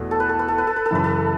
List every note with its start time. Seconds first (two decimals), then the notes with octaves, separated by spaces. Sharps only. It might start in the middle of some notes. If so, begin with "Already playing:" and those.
Already playing: E2 B2 A3 F#4
0.11 A4
0.20 B4
0.29 A4
0.39 B4
0.48 A4
0.58 B4
0.67 A4
0.76 B4
0.86 A4
0.91 F#2 C#3 E3 B4
1.04 A4